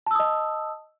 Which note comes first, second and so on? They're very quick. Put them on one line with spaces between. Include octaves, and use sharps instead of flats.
A5 E6 D#6 D#5